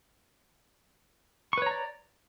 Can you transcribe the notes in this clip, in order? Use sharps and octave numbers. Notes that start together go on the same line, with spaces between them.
B4 C#5 D5 A#5 C#6